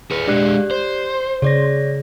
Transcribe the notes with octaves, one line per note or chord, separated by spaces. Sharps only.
G#4 B4 C#7
G#3 D4 G4 D5 F#6
C5
C#3 C#5 D5 A#6